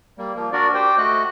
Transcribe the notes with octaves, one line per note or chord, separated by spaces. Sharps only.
G3 A#3
F3 A#3
D4 F#4 A#4 D5
G4 C5 G5
A3 F#4 D#5 F#6